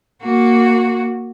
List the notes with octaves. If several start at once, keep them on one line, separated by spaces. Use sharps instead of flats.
A#3 F#4